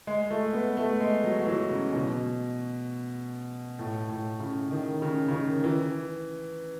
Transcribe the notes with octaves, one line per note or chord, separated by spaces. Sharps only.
G#3
A3
B3
A3
G#3
F#3
F#3
E3
C#3
B2
A2
A2
C#3
D#3
C#3
C#3
D#3
E3